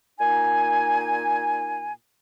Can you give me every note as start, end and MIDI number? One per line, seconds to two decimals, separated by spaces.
0.20 1.93 46
0.20 1.93 63
0.20 1.93 80